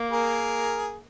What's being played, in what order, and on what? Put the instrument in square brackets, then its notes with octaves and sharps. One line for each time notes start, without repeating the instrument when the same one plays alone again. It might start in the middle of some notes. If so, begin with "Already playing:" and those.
Already playing: [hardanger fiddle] A#3
[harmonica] G#4 A#4